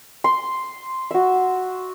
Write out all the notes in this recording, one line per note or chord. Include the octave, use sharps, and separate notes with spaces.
C6
F#4 E5